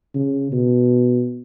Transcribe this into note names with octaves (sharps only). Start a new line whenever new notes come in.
C#3
B2